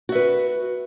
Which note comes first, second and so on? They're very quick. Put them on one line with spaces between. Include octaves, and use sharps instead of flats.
F#4 E5 B4